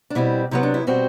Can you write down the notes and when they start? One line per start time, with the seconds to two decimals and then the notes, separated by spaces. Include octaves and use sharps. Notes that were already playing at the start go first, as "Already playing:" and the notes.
0.10 D4
0.15 B2 G3 C4 E4
0.51 C3 F#3 B3 E4
0.63 D4
0.74 E4
0.87 B2 G3 C4 F#4